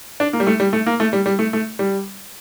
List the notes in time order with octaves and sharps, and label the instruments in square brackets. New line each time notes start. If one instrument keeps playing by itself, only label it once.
[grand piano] D4
A#3
G3
A3
G3
A3
A#3
A3
G3
G3
A3
A3
G3